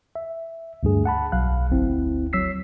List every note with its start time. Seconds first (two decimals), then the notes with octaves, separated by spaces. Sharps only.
0.15 E5
0.83 D2 G2 G#4
1.05 F#5 A5 B5
1.32 B1 F#3 F5 F#6
1.70 G1 D2 C4 E4
2.33 F#3 C#5 E6 B6 C7